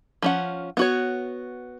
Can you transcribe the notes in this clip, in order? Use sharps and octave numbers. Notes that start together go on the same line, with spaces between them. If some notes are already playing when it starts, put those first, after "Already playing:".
F3 C#4 F#5
B3 F#4 C#5